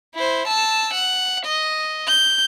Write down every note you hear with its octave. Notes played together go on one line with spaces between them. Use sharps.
E4 C5
A5 E6
F#5
D#5
G6